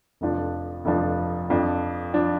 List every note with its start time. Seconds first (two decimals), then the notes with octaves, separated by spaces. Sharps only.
0.21 F1 F2 F3 D4
0.85 F1 F2 F3 D4
1.50 F2 F3 D4
2.14 F3 D4